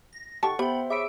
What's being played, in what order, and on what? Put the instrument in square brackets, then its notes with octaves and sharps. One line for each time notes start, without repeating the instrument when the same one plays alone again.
[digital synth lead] A#6
[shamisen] D#3 G4 A5 [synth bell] A4 [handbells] F#5 [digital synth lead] C#6
[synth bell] B3 G5 [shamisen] G4 [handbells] C5 E5 [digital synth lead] B5
[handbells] G#4 E6 D7 [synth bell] C#5 B5 D6 [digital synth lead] E5